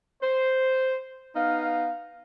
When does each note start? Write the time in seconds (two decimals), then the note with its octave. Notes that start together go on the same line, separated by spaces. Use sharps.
0.22 C5
1.35 B3 D#4 F5